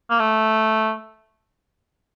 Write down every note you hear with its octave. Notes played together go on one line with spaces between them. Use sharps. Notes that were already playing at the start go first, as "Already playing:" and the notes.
A#3
A3